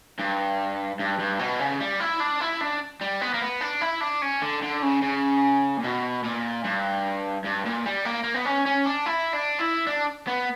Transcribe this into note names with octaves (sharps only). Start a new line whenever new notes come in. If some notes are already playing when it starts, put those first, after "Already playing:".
G2
G2
G2
B2
C#3
G3
E4
D4
E4
D4
G3
B3
A#3
B3
D4
E4
D4
C#4
D3
D3
C#3
C#3
A#2
B2
A#2
G2
G2
A#2
G3
A#3
A#3
B3
C#4
C#4
D4
E4
D4
E4
D4
B3